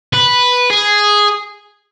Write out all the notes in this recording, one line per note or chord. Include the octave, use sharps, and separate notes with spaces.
B4
G#4